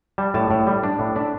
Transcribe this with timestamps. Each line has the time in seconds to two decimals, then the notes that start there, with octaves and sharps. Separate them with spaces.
0.18 G3 A5
0.34 A2 A5
0.51 A2
0.67 G3
0.84 D4
0.99 A2
1.16 D4 E5